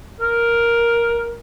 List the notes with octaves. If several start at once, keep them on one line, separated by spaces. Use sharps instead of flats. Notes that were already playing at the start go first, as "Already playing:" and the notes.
A#4